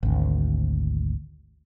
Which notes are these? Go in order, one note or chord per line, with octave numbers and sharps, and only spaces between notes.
G#1 D2